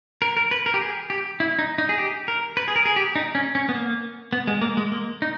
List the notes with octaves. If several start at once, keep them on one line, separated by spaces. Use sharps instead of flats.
A#4
A#4
B4
A#4
G4
G#4
G4
E4
D#4
D#4
G#4
G4
A#4
B4
G#4
A#4
G#4
G4
D#4
C#4
C#4
B3
A#3
B3
G#3
A#3
G#3
A#3
D#4